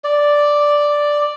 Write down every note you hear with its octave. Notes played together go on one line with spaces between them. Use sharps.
D5